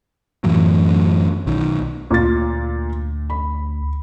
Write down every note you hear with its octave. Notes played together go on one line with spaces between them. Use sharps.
F#2 A2 E3 F#3
B1 D#3
D2 A#2 F4 A6
B5